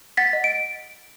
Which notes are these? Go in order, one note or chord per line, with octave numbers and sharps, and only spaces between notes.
F#5 A6 B6
D#5
D7